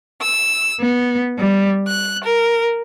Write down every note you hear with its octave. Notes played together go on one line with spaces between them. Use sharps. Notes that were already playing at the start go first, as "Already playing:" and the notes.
E6
B3
G3
F#6
A#4